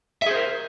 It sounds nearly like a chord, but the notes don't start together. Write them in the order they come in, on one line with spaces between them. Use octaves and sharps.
E5 G#4 C5 A#4